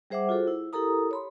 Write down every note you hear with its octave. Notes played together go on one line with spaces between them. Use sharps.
G3 G#4 C5 E5 F#5 D6
F4 F#4 G#4 A4 C5
E4
E4 G4 A4 A#4 A#5 D#6
C#5 B5 C6